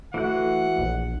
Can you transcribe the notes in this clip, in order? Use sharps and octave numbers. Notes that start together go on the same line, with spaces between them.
E3 A3 F#4 F#5 F#6
A#1